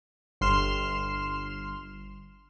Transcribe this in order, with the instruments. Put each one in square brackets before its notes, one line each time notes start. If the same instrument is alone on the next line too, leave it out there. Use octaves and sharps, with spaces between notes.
[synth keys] G1 C6 F6 E7